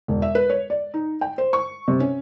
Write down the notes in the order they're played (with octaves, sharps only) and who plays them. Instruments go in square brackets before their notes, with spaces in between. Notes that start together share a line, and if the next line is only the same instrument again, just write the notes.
[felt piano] E1
E5
B4
C#5
D5
D#4
G5
C5
C#6
C3
C#4